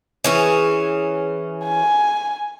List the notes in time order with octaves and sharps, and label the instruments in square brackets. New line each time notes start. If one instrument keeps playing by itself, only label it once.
[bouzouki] E3 C#4 G#4
[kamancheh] G#5